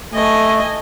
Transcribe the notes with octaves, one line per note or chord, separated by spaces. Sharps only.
A3 D#5 G#5